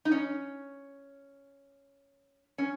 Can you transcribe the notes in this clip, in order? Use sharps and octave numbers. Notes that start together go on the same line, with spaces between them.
D#4
C#4
C#4